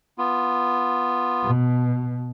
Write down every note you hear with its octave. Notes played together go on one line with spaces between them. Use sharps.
B3 F4
B2